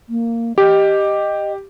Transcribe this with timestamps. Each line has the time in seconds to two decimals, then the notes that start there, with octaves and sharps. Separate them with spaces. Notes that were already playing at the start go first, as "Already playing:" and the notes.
0.09 A#3
0.58 G4 D#5